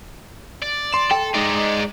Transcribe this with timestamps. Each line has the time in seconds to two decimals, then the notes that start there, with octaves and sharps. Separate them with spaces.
0.62 D5
0.92 C6 E7
1.11 A4 G5
1.34 G#3 D#4 D5 D#5